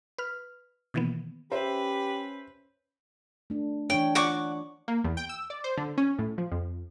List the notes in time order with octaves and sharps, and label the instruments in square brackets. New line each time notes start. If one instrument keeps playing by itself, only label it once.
[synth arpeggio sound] B4 F6
B2 D#3 E3 A#3 B3
[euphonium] C#4 [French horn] G4 [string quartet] B4 [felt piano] C5 E5
[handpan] A3 D4
[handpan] E3 D4 C#5 [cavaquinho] G5
[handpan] F4 D5 [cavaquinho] F#5 C#6 D6
[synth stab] A#3
E2
G5
E6
D5
C5
D3
C#4
A2
F3
F2